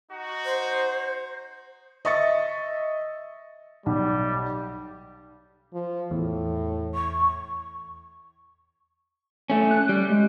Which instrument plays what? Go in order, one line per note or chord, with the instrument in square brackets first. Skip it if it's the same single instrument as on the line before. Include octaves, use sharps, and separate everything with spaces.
[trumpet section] D#4 F#4
[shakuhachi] C5
[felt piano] D#5 E5 C#6 A6 C#7
[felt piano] B1 [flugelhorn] G3
[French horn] F3
[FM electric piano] E2 [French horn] A2
[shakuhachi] C#6
[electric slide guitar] A3 C#4
[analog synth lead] F#6
[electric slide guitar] G3
[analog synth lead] G#3